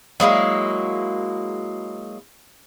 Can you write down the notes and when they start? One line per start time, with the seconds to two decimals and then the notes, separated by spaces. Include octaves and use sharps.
0.20 F#3 G#3 A#3 E4